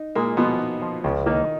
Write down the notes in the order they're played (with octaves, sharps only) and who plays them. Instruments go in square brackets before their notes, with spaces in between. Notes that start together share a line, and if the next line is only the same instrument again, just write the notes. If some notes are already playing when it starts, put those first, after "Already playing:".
Already playing: [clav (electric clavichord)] D#4
[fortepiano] A#2 A#3 [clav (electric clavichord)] G#3
[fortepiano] B2 B3 [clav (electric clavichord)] F3
[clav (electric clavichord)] D#4
F3
[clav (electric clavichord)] C#2 [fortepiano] C#3 C#4
[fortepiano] D#3 D#4 [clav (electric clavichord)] A#3